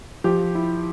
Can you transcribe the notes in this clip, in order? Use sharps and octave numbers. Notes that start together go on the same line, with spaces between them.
F3 G4
E4